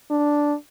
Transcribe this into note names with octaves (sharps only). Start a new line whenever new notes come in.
D4